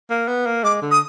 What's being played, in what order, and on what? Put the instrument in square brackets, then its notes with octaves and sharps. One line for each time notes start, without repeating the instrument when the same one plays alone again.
[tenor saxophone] A#3
B3
A#3
[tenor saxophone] G#3 [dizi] D6
[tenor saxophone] D3
[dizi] D#6